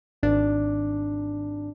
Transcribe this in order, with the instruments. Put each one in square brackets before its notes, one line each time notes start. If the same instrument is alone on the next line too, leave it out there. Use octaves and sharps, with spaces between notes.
[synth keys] G#1 D4